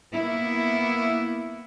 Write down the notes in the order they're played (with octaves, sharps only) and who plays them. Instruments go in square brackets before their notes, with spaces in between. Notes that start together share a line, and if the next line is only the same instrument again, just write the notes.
[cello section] A#3 B3 E4